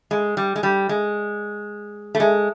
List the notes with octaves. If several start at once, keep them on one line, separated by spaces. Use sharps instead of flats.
G#3
G3
G#3
G3
G#3
A3
G#3